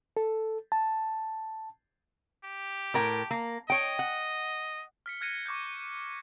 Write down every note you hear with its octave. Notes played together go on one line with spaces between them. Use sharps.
A4
A5
G4
A2 A#4 G5
A#3
C#5 D#5 G5
F#5
F6 B6 C#7
F6 F#6 G#6 A#6 C#7 D#7
C#6 D6 F6 G6